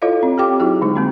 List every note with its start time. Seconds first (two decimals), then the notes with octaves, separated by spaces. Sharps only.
0.02 E4 F4 A4 C#5 D#5 F5
0.23 C4
0.38 G4 G5 D6
0.60 F#3 D#4 E4 F#4 G#4
0.82 D3 G#3 D#4
0.96 G#3 A#3 C4